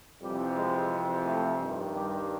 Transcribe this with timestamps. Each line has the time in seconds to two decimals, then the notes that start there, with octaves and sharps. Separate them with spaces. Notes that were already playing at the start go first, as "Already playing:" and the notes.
0.21 F2 C3 E3 G3
0.55 G#3
1.25 A3
1.59 G2 D#3
1.93 G3